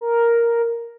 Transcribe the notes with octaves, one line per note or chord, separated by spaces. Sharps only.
A#4